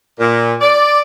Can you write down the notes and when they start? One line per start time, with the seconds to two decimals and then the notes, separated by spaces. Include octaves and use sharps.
0.20 A#2
0.61 D5